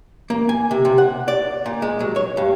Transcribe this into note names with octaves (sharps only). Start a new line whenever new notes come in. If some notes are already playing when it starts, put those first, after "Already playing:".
A#3
G#5
C3
C3
F#5
D5
A#2
G#3
F#3
C#5
G2